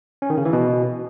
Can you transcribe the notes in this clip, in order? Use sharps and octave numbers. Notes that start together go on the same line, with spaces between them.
C#4
D#3
C#3
E3
B2